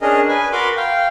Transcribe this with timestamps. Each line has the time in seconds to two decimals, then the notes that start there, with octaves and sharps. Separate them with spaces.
0.01 C#4 D4 G#4 A#4 D#5
0.28 B4 G#5
0.52 F#4 A#4 B5 C6 D6
0.77 F5 G5